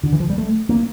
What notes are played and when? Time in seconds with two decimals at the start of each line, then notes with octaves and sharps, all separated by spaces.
0.03 D3
0.13 E3
0.20 F3
0.30 G3
0.38 A3
0.69 A#3